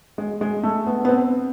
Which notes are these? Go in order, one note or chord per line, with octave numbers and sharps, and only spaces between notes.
G#3
G#3
A3
B3
B3
C4